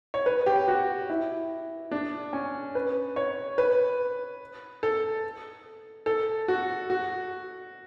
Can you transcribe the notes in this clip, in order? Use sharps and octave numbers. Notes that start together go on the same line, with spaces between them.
C#5
B4
G4
F#4
E4
D4
C#4
B4
C#5
B4
A4
A4
F#4
F#4